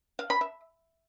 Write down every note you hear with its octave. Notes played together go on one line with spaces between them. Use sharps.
F5
B5
E5